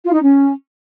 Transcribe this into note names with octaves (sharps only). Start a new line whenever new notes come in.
F4
D#4
C#4